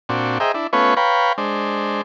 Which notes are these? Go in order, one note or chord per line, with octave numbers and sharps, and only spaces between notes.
A#2 C4 D4 F#4
G#4 C5 D#5 E5 G5 A#5
D4 E4
A3 B3 C#4 F4 B4 C#5
B4 C#5 F5 G5 A#5 B5
G#3 D4 C5